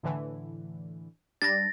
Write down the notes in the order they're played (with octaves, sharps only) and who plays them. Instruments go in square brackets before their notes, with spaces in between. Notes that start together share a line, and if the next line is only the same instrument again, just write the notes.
[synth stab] A2 D3 E3
[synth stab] G3 D4 [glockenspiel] A6 A#6